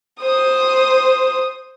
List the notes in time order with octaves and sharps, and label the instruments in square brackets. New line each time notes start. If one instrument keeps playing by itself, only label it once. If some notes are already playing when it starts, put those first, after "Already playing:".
[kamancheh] C5 D#6